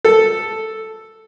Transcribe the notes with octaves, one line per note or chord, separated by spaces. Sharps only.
A4